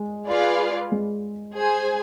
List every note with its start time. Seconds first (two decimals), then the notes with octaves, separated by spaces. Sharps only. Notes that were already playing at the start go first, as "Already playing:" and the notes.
Already playing: G#3
0.27 F4 G#4 B4 D5 F5
0.92 G#3
1.55 G#4 C5 G#5